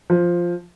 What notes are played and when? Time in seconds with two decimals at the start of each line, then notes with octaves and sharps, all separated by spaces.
0.10 F3